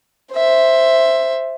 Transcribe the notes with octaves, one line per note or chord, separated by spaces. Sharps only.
C5 E5